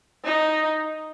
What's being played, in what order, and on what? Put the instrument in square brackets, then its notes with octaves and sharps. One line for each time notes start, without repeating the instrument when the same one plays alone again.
[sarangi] D#4